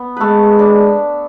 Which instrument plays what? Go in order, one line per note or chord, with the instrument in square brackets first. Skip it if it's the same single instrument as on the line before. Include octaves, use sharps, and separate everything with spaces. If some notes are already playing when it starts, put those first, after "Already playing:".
Already playing: [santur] B3
[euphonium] G#3 [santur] A3 A4 B4
[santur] D4